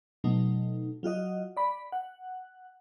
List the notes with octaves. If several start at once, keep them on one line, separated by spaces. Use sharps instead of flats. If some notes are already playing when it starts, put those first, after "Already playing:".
B2 F#3 A3 D#4
F#3 F4 F#4 D#5
D5 B5
F#5